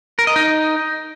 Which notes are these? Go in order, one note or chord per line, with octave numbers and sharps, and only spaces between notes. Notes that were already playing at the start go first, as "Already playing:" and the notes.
A#4
D#5
D#4